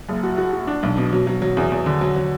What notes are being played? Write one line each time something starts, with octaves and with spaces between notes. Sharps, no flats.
F#1
F#4
F#4
F#4
D4
B1
B2
F#3
F#3
F#3
E2
E2
D3
F#3
F#3